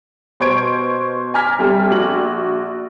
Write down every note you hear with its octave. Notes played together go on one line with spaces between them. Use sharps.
B2 C5 C#6 G#6 D7
G#5 A#5 D6 F6 G#6 B6
G1 C3 G3 A4
A#1 F#4 F#7